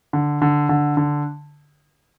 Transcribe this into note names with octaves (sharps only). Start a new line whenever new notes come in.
D3
D3
D3
D3